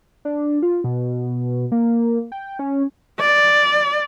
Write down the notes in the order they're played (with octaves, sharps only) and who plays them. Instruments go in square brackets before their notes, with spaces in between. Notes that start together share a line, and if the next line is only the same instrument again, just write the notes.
[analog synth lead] D4
F4
B2
A#3
G5
C#4
[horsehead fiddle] D5